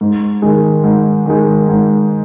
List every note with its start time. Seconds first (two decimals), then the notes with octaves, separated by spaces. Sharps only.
0.01 G#2
0.42 D#3 G#3
0.84 G#2
1.26 D#3 G#3
1.69 G#2